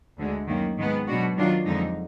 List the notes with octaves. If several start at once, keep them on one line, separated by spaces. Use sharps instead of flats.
D2 D3 G#3
F#2 D#3 A#3
G#2 D#3 G#3 B3
B2 F#3 D4 F#4
D#3 F#3 D4 F4
F2 D3 G#3 D#4